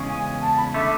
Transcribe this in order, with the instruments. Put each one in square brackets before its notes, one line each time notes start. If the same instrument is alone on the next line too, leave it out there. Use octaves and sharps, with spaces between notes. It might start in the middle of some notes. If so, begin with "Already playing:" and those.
Already playing: [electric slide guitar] E2 C#3 G#3 C#4
[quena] G#5
A5
B5
[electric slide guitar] D3 A3 [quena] E5